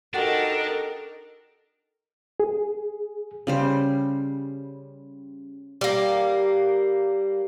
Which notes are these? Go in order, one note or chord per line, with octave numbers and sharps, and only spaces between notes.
D4 D#4 F#4 G4 A4 A#4 C#6
G#4
C#3 G3 C5
G3 A#3